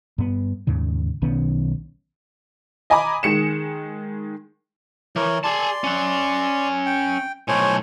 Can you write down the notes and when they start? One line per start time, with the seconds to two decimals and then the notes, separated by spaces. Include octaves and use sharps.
0.18 G2 B3
0.67 D#2 G#2 C#3
1.22 B1 D#3 B3 C#4
2.90 D#5 G#5 A#5 B5 D6
3.23 D#3 G#3 C#7 E7
5.16 E3 A#4 C#5
5.44 G#4 D5 A5 C6
5.84 C#4 F#5
6.86 G5
7.48 B1 A2 C5 C#5 G#5